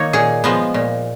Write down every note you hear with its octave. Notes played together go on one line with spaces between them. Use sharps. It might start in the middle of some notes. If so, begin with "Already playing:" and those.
Already playing: D#3 A#3 D#4 C#5
A#2 G#4
F3 G#3 B3
A#2